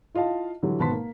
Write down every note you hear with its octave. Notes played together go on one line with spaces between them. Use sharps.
E4 F4 D#5 F5 A5
D3 E3 F#3 G3
G#1 B2 B4 A5 C6 B6
A#3